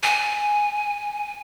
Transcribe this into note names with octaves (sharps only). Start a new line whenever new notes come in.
G#5